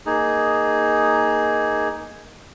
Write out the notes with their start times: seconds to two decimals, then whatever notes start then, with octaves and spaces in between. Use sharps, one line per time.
0.06 A#3 D#4 G#4